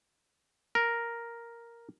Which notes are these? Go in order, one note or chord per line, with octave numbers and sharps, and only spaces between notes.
A#4